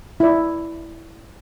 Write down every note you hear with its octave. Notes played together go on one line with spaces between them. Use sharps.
E4 D5